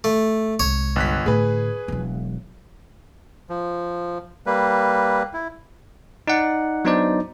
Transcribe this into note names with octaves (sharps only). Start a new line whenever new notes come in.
A3
C2 G#3 C#5
G1 F#6 B6
A2 D3 G#4 B4
E1 F#3
F3
G3 A#3 B4
E4
D#4 D5 F#5
F#3 B3 D4 D#4 C5 D5